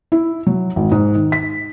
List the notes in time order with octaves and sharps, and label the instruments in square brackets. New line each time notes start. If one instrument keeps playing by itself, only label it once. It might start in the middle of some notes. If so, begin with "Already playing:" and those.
[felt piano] E4
F#3
G#1
G#2
D#3
B6